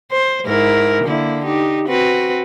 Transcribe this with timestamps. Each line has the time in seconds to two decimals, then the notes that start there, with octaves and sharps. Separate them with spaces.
0.12 C5
0.46 G#2 E4 A#4
1.04 D3 A#3 E4
1.45 D#4 G4
1.88 C4 F#4 B4